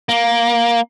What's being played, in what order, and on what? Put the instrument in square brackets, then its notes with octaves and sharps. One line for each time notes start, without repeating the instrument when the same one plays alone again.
[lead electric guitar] A#3